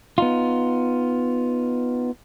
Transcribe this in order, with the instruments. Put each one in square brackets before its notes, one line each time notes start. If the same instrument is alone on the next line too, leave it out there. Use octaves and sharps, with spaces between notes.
[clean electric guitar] B3 D#4 F4